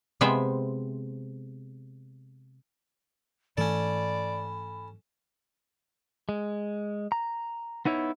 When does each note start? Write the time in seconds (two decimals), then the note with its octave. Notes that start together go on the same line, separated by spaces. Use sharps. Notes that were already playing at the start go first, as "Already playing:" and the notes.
0.21 C3 G#3 B3 C5 E5 G5
3.58 G#2 E3 A3 C#4 A4 D5 B5
6.29 G#3
7.12 A#5
7.86 B3 D#4 E4 C#5